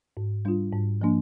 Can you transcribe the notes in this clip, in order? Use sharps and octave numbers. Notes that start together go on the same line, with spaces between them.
G#2
G3 D4 F4
G#2
F3 A#3 D4